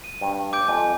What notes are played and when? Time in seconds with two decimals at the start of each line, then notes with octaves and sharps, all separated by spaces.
0.04 D#7
0.21 G2
0.53 D6 G6 D7
0.68 F2 G#5